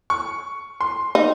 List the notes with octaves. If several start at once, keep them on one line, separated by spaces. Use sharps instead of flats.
C#6
C6
D#4